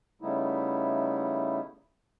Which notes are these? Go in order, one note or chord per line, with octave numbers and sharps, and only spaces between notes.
C#3 G3 A3 B3 D#4 E4